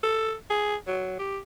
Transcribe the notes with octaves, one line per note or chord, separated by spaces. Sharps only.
A4
G#4
F#3
G4